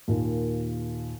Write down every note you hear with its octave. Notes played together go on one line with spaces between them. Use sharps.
D#2 A#2